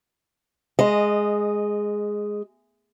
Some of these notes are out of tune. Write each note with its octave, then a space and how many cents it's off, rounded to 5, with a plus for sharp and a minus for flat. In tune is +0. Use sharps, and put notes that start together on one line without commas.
G#3 +0 D#5 -15